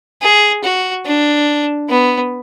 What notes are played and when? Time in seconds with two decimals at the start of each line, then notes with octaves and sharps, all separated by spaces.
0.22 G#4
0.64 F#4
1.06 D4
1.89 B3